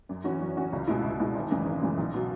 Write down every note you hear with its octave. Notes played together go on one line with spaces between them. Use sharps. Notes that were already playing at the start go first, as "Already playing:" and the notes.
F#2
E3 C#4 F#4
F#2
E3 C#4 F#4
C#2
B2 G#3 E4
C#2
B2 G#3 E4
G#1
F#2 C#3 E3 G#3
G#1
F#2 C#3 E3 G#3
B1
B2 F#3